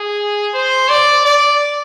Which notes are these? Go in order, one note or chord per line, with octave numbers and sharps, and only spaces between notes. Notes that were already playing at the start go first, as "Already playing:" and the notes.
Already playing: G#4
C5
D5
D5